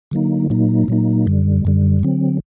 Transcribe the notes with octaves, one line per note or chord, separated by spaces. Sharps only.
D3 F#3 A#3 D#4
A#2 F#3 A#3 D#4
A#2 F#3 A#3 D#4
F#2 D3 G3
F#2 D3 G3
D3 F#3 C4